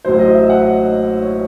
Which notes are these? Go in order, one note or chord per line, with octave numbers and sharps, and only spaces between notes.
A1 A2 F#3 C5
D#5
E5
F#5
D#5
C#5